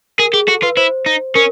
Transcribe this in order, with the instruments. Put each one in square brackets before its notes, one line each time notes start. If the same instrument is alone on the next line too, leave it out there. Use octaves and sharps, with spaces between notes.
[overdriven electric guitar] G#4 [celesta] A#4
[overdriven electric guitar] G4 [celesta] G#4
[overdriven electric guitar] F#4 [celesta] A4
[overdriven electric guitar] F4 [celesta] B4
[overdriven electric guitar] E4 [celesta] C5
[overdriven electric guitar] D#4
[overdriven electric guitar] C#4 [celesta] A#4